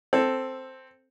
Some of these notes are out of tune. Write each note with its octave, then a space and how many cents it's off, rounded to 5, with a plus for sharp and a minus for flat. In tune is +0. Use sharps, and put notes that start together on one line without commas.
C4 +0 A4 +0